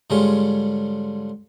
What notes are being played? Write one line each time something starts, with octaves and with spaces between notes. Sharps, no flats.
G#2 D3 G3 G#3 C#4 F4